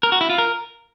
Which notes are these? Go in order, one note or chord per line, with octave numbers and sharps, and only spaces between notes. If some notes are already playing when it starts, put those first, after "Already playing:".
A#4
F#4
E4
F4
A#4